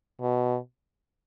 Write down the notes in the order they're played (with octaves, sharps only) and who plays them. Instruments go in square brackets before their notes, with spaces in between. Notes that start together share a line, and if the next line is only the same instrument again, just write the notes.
[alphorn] B2